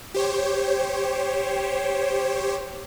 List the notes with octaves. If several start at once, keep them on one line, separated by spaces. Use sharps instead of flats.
G4 C5 C#5